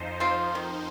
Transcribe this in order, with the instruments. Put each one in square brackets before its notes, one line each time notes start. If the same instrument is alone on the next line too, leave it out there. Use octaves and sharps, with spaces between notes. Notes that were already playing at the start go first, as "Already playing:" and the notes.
Already playing: [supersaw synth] F2 F3 D#4 C5
[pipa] C4 F4
D#3